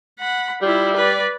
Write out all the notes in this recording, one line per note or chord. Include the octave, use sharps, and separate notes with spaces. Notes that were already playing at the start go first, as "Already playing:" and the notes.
F#5 B5
G3 E4 F4
B4 D5